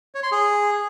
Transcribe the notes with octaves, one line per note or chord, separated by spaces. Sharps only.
C#5
C6
G#4